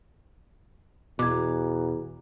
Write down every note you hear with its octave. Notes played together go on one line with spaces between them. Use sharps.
E2 B2 F#4 A#5 D6 G#6